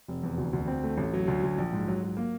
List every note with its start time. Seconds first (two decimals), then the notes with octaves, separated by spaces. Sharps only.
0.08 F1
0.23 E2
0.38 D2
0.53 D2
0.67 C4
0.84 A3
0.98 A1
1.13 F#3
1.28 D2
1.43 D2
1.58 A#1
1.73 G#2
1.88 F#3
2.03 F#3
2.17 A#3